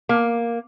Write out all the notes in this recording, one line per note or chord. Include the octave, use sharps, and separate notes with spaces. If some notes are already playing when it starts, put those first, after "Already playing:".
A#3